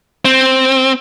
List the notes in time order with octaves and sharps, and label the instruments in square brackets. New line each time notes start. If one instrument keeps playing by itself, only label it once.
[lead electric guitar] C4